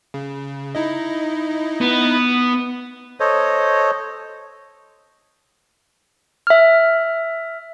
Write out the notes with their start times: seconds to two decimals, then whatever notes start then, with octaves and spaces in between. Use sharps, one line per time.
0.14 C#3
0.75 D#4 E4 D#5
1.81 B3
3.20 A4 C5 C#5 D#5
6.47 E5 F6